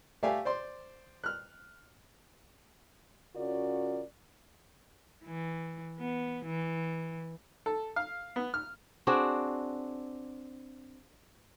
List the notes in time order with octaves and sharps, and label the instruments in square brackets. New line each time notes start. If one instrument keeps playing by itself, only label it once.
[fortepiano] A3 G4 D5 E5 F5 G#5
C5 D5 C6
F6 F#6
[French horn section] C#3 C#4 F4 F#4 A#4 D5
[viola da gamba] E3
B3
E3
[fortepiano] A4
F5
B3
F6
[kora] C4 D4 F#4 G#4